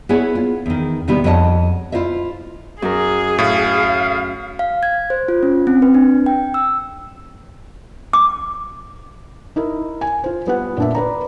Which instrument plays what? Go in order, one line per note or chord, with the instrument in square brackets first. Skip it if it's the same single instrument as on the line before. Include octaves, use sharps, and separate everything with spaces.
[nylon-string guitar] B3 E4 G#4 C#5 G#5
F4
E2 D#3
C3 D#3 G3 B3 E4 G4
F2 F#4 C#5 D#5 G5 A5
E4 F4 C5 D#5 E5
[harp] F#2 A#4 [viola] G#4
[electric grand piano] A2 [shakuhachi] F5
[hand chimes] F5
G#6
C5
F4
C#4
C4
B4
D4
G5
E6
[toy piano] D6
[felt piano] D#4 E4 A#4
G#5
F4 C5
G3 B3 F4 F#5
A#2 D4 E5
B4 D5 A#5